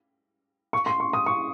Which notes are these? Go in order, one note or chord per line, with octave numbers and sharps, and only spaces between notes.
C#6
C6
C#6
D#6
C#6